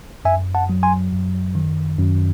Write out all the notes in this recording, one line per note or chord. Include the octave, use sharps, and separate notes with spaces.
F#2 E5 G#5
F#5 A5
F#3
G#5 C6
F#2
D#3
F#2